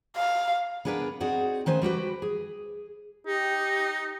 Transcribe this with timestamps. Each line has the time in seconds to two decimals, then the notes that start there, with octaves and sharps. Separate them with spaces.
0.16 F5
0.85 B3 D4 G#4 A#4 B4
1.20 C4 D#4 F#4 G#4 D5
1.66 D#3 A3 C#4 B4 C5 G#5
1.82 G3 F#4 G4 B4
2.22 G#4
3.27 D#4 G4